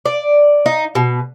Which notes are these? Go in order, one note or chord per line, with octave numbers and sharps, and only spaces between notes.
D5
D#4
B2